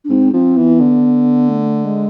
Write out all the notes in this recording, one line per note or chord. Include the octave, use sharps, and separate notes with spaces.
D4
G#2 C4
F3 C4
E3 B3
D3
A3
G#3